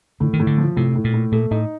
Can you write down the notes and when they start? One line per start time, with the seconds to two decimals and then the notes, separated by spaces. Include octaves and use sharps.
0.20 A2 D3
0.33 D#3
0.40 A2
0.47 D3
0.58 F3
0.76 A2 C3
0.95 A2
1.04 A#2
1.14 A2
1.32 A#2 A3
1.51 A2 D#4